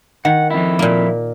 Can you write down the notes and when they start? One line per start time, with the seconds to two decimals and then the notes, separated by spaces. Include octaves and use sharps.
0.25 D#3 F#5
0.51 F2 E4
0.79 A#2 A#3